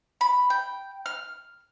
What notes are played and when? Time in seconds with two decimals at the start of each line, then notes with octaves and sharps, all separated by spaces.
0.21 B5
0.50 G5
1.06 F6